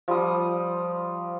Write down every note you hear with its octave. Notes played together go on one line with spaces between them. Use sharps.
F3 G3 D#6